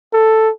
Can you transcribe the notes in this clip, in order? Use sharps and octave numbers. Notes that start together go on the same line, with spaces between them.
A4